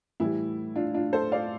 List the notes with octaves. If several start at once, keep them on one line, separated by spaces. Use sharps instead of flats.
A2 E3 G3 E4
D4 F4
D4 F4
A4 C5
D5 F5